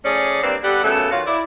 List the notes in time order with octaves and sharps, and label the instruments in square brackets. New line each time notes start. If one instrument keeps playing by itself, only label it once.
[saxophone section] F3 A3 C#4 G#4 D5
G3 A#3 C4 D4 B4 D5
G3 B3 G4 A4 D5 F#5
F#2 C#3 A3 B3 A4
D#3 F4 F#4 C#5 F5
E4 D5